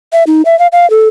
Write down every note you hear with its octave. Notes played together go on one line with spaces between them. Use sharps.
E5
D#4
E5
F5
F5
A4